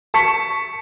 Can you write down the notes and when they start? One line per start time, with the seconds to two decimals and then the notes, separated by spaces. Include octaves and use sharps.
0.14 A5 C#6 B6 C#7